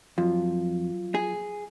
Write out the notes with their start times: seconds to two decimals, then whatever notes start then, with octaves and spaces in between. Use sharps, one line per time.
0.18 F2 F#3 F4
1.15 G#4